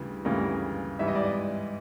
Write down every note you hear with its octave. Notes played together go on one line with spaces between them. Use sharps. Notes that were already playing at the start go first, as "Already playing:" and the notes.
Already playing: D2 C#3 E3 G3
D2 C#3 E3 G3 A#3
G#2 E3 G3 E5
D#5
D5
D#5